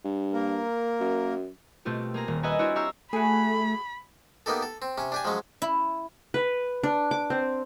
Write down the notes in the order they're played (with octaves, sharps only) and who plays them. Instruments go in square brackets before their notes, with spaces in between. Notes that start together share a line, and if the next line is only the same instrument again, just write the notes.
[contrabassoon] G2
[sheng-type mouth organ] A#3 A#4
[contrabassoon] F#2
[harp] B2 A3 C4 F4 G4
A#3 G#4 A#5
D#1
B4 D#5 E5 F#5 G#5 A#5
C4 D4 E4 F#4 C#5
G4 E5 F5 A#5 C#6 E6
[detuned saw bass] A3 [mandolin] F#4 G#4 [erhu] B5
[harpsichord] A#3 B3 D#4 G4 A4
A4
C4
C3 C#4
D4 G4 G#5
F3 F#3 G#3 C#4
[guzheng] E4
[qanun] B4
D4
D6
C4